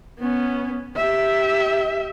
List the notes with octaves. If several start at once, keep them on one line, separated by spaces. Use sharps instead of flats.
B3 C#4
G4 E5